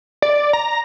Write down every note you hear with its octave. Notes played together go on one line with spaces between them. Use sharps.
D5
A#5